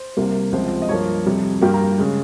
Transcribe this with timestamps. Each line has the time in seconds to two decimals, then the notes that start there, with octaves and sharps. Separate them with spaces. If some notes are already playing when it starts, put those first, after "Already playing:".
Already playing: C5
0.17 C2 C3 G3 A#3
0.52 C#2 C3 F3 C5
0.82 D#5
0.89 G2 F3 A#3 C#5
1.26 F2 C3 G3
1.62 G2 G3 A#3 G5
1.74 A#5
1.99 C#3 G#3